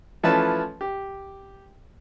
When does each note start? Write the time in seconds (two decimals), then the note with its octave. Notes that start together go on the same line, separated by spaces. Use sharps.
0.23 E3 F3 A3 C#4 B4 A5
0.81 G4